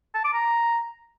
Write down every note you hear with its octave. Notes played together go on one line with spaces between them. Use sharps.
A5
D6
A#5